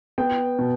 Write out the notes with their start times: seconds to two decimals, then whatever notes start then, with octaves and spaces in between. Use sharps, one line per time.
0.18 B3 G5
0.59 B2